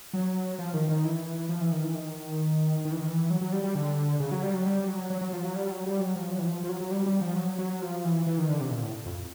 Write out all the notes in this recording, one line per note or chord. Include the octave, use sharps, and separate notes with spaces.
F#3
F3
D#3
D#3
E3
F3
E3
D#3
E3
D#3
D#3
E3
D#3
E3
F#3
F#3
G3
G3
D3
C#3
F#3
G3
F#3
G3
F#3
F#3
F#3
F3
F#3
G3
F#3
G3
F#3
F3
F#3
E3
F3
F3
F#3
F#3
G3
G3
F3
F#3
F#3
F3
E3
E3
D#3
D3
C3
A#2
A2
F2